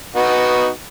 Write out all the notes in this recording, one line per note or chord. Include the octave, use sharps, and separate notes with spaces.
B3 D#4 F#4